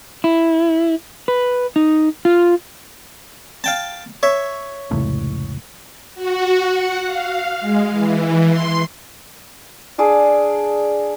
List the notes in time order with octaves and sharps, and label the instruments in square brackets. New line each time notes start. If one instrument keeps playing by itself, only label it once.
[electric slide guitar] E4
B4
D#4
F4
[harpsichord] F5 G5 A5
C#5 E5
[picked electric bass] F1 C#2 A2
[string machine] F#4
F#5
F5
G#3
E3
C6
[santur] D4 G#4 D5 F5